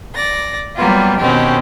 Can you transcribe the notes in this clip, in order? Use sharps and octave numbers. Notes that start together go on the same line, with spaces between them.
D5 A#6
F#3 G3 A#3 B3 F4
B2 D#3 C4 C#4 G4